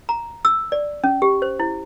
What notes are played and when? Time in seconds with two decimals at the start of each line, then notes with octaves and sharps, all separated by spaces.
0.09 A#5
0.45 E6
0.72 D5
1.04 C#4
1.22 G4
1.42 C5
1.60 E4